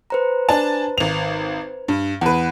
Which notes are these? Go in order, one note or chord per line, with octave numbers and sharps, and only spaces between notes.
B4 C5 A#5
D4 G#5 A5
G#1 F7
G2
E2 B4 F#5